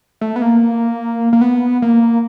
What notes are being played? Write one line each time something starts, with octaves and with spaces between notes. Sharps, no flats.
A3
B3
A#3
A#3
B3
A#3